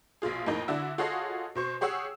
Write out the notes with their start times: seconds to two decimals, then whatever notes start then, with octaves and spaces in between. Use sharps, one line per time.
0.22 A#1 B2 F4 G#4
0.46 F2 A2 A#3 D#4
0.68 D3 D4 E4 F#4 E6
0.98 F4 F#4 G#4 A4 C#5 D#5
1.55 B2 C5 C#6
1.81 G4 G#4 C#5 F#5 E6